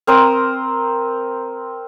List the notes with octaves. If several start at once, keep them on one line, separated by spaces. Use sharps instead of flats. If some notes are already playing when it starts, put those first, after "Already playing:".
C4 A#4 C5 D#6